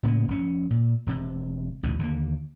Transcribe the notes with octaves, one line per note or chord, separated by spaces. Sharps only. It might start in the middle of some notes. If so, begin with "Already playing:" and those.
A2 C#3 A#3 B3
F1 C#4
A#2
E1 C3
A1 D2 B2 D#3
D#2 D3 A#3